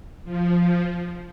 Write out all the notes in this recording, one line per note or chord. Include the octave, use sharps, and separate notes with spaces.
F3